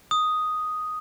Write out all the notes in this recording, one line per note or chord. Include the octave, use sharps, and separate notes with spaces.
D#6